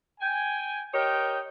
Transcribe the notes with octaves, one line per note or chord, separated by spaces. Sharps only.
G5 G#5
G4 A#4 C#5 D#5 G5